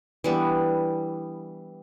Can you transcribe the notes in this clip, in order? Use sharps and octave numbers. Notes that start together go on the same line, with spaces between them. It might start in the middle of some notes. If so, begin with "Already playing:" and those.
E3 G3 B3 D4